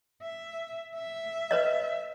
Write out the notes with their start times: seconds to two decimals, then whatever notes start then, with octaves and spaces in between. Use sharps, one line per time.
0.22 E5
0.95 E5
1.51 B4 C#5 D#5